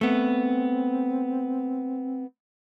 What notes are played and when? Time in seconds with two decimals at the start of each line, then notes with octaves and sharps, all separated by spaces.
0.01 A3 B3 C4